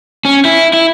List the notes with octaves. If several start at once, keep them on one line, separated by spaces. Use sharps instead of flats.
C#4
E4
E4